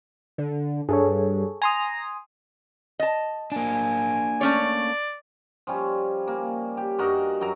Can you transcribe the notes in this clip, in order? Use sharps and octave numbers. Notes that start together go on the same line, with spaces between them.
D3
G2 G#4 A4 C#5
G#5 A#5 C6 D#6
D#5 A5
A#3 D4 G#5
A3 C#4 C#5 D5
F3 G3 C#4
A#3
G4
G2 F#4 A#4 D#5
F#2 F#3 A#4 A#5